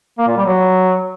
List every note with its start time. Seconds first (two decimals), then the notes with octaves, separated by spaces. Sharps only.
0.18 A#3
0.27 A#2
0.37 G3
0.46 F#3